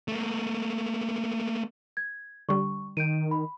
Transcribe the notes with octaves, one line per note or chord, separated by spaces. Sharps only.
A3 A#3
G#6
D3 G3 C#6
D#3 G6 D7 D#7
B5